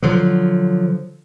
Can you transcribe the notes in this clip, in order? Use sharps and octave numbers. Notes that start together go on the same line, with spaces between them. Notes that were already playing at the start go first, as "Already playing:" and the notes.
D3 F3 F#3